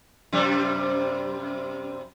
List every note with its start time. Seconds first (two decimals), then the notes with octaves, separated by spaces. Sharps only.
0.33 F#2 C3 G3